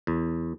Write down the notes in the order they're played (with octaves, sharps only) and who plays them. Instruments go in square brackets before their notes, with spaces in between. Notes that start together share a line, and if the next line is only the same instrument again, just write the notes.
[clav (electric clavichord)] E2